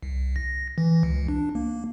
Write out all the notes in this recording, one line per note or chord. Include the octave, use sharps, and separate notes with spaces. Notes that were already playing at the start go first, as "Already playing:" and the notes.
C2
A#6
E3
C#2
D4
A#3